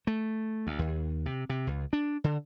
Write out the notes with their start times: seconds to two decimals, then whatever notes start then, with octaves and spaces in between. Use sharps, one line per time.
0.07 A3
0.67 D2
0.79 D#2
1.26 C3
1.49 C3
1.67 C#2
1.93 D4
2.24 D3